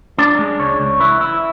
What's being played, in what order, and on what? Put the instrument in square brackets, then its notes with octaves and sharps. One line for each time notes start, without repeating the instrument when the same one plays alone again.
[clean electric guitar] D4 D5
G#3
C#2 C#5
C#2
E4 B4
E4